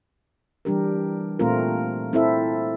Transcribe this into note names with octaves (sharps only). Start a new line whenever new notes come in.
E3 G3 D4 G4 A#4
A#2 A3 C4 F4 A#4
C4 E4 A4 E5